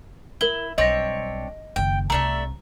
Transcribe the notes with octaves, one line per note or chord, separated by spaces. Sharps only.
E4 A#4 G7
B1 G3 C4 D4 C#5 D#5 A#6
F#1 D#3 G5
C2 C3 A3 D4 E5 A#5